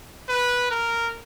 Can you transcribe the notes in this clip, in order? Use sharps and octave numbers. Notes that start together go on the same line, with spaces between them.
B4
A#4